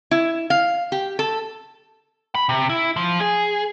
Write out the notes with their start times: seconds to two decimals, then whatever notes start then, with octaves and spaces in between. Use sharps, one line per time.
0.11 E4
0.50 F5
0.92 G4
1.19 A4
2.35 B5
2.49 C3
2.70 E4
2.96 F3
3.20 G#4